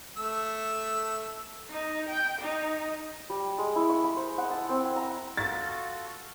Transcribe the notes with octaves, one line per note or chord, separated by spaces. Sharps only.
A3 E6
D#4
G5
D#4
G3
G#3
E4
C#6
B5
C5
F#5
A5
C4
G#5
A#5
F4 F#4 A4 A6